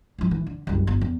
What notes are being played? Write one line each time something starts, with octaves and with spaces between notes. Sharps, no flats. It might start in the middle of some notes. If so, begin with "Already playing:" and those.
G#2 F3
E3
D3
F#1 C2
G1
E2